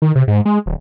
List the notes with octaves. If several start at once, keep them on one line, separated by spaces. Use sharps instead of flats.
D#3
C3
G#2
G#3
D1